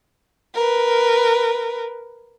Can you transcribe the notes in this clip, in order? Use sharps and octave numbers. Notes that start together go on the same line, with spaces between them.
A#4 B4